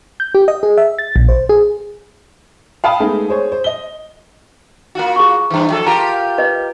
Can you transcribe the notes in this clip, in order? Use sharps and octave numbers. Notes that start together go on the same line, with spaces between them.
G6
G4
D#5
G#4
E5
A6
A#1
C5
G#4
F5 G5 A5 B5 D#6
G#3 A3 B3 D#4 G#4 A4
G#4 C5 C#5
C5
D#5 G7
A#3 F4 F#4
G#4 C#6
G2 E3
F3 A4
F4 G4 A#4 A5 A#5
B4 D#5